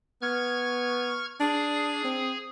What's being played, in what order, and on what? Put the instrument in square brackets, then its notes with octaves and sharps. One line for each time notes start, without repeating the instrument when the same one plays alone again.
[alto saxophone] B3 [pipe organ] C#6 F6 G#6
[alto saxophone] D4 [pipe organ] G#4
[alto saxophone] C4